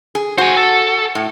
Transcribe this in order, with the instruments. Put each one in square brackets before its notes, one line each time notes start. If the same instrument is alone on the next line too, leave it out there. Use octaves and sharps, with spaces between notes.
[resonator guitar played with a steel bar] G#4
[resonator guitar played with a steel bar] F#4 [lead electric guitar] C5 G#5
[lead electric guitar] A4
[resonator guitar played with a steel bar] A2